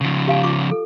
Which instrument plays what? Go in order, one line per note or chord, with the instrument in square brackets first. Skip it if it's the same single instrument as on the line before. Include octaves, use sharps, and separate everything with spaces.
[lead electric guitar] C#3 F3
[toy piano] G4 F5 G#5
F4 C#6 D6
A4